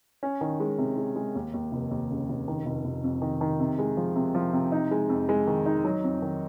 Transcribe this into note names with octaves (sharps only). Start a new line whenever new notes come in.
C#4
D#3
G#3
C3
G#3
G#3
D#2
D#2
F1
D#2
C#3
F1
D#3
F1
F1
F2
D#3
D#3
C3
G#3
F3
C3
F3
C3
D#4
G#3
F2
G#3
D#3
D#4
F#3
F2
D#3